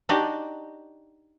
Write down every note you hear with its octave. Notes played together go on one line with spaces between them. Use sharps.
D4 D#4 F#4 G4 D5 D#5